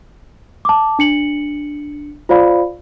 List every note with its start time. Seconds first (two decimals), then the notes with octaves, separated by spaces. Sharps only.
0.65 A5 D6
0.99 D4 C#7 F#7
2.29 F4 C5 D5 F5 B5